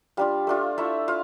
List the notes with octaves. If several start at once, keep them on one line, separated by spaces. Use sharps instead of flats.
G3 D4 F4 F5
A3 D4 F4
A3 E4 E5
F4 F5